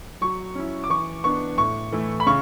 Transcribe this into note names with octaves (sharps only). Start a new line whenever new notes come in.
F#3 C#6
C#4 E4
D6
E3 C#6
B3 D4 C#6
A2 C#6
E3 A3 E4
B5
C#3 C#6